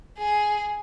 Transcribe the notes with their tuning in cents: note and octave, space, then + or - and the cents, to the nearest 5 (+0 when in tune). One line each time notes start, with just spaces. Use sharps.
G#4 +10